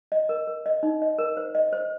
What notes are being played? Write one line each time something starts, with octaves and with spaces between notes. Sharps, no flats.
D#5
A#4
A#4
D#5
D#4
D#5
A#4
C5
D#5
C5